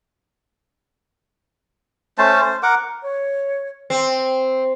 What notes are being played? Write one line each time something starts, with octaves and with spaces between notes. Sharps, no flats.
A3 C#4 C5 A5
C5
A#4 F#5 D6
C#5
C4